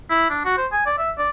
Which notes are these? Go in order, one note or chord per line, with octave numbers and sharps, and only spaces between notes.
E4
D4
F#4
C5
G#5
D5
E5
D5